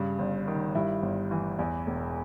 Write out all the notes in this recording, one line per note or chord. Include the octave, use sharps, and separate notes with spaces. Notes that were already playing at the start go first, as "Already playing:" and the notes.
Already playing: G2 C#3
G1
D#3
G2 E4
G1
E3
E2
E1